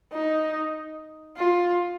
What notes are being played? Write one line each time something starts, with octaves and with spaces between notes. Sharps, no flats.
D#4
F4